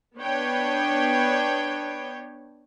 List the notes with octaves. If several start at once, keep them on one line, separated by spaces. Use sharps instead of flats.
B3 D4 B4 C#5 G5